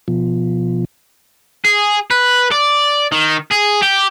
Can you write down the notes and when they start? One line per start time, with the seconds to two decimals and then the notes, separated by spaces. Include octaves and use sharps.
0.08 B2 F3
1.65 G#4
2.10 B4
2.52 D5
3.12 D#3
3.52 G#4
3.82 G4